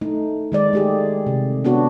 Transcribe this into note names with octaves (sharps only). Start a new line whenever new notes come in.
A3 D#4
D#3 G#3 D5
A3 G4 G#4
C3
B3 D4 F#4 C#5